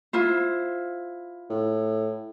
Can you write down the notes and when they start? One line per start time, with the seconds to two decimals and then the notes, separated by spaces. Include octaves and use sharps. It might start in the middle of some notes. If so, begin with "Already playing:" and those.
0.13 E4 F4 C5
1.50 A2